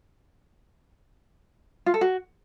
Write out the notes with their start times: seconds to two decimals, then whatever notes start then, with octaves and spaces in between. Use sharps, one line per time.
1.86 F4
1.94 A4
2.01 F#4